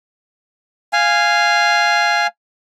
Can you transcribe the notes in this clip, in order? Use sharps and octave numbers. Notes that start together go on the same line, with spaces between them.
F5 G#5